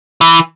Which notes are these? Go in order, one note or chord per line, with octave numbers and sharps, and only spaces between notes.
E3